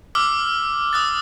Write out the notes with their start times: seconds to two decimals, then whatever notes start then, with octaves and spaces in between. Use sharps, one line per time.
0.15 D6 E6 F6
0.93 D#6 F#6 A6